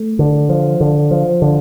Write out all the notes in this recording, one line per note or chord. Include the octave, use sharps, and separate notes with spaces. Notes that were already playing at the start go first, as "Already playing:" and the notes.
Already playing: A3
D3
F3
D3
F3
D3